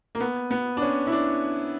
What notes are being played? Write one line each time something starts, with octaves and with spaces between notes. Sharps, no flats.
A#3
B3
B3
D4
C#4
E4
D4